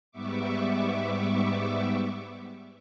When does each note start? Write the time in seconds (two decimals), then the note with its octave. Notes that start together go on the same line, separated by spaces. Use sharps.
0.11 G#2 G3 B3 E5 C#6 D6